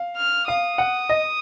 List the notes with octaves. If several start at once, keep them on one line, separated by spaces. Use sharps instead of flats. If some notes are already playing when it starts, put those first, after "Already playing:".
Already playing: F5
F6
F5 D#6
F#5
D#5